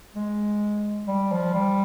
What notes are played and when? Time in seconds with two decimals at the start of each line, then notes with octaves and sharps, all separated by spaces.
0.16 G#3
1.08 G3
1.32 F3
1.54 G3